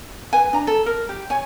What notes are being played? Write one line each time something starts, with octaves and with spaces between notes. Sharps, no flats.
B4 G#5
D4 A#5
A4
A#4
G4
C#5 G#5